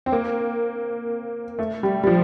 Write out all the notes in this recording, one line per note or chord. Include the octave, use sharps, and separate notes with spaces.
C4
A#3
A3
G3
G3
F3